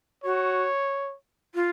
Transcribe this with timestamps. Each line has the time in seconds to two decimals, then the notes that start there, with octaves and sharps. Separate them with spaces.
0.24 F#4 C#5
1.55 F4